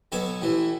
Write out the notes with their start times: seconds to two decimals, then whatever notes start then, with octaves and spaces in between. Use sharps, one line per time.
0.12 B1 B2 A4 C#5
0.42 A1 A2 E3